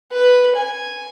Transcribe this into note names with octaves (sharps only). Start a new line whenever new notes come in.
B4
G#5